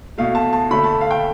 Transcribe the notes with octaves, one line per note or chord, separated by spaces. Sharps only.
B2 A3 F5
A5
A5
D3 A3 B5
A5
F5
G5